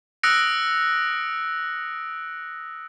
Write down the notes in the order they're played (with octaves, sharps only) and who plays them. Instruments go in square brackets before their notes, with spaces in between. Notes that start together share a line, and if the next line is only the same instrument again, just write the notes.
[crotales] D#6 E6 F#6 A#6 C#7 D7